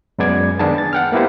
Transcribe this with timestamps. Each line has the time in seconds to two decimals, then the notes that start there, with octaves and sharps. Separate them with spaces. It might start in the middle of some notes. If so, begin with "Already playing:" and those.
0.18 F#2 G#3 B3 D5 G#6
0.59 D#3 B3 D4 G#4 A5
0.78 A6
0.93 F#5 G5 F6
1.12 A#3 B3 E4 G4 C5